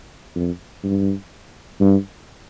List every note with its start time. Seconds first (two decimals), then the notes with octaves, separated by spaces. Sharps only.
0.35 F2
0.83 G2
1.81 G2